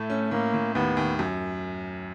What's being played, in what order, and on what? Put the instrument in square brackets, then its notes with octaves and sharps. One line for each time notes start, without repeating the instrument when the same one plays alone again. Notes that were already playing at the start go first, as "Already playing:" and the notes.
Already playing: [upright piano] A2 [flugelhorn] A3
[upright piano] C#4
[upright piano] A2 [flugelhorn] A#3
[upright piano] A2
[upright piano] D#2 [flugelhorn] B3
[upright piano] D#2
F#2